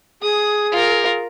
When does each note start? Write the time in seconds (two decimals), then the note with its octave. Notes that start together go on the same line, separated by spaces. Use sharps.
0.22 G#4 D#6
0.72 F4 A#4